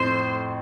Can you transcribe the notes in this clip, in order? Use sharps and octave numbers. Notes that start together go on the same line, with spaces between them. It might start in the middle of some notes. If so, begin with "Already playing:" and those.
Already playing: F2 A2 C5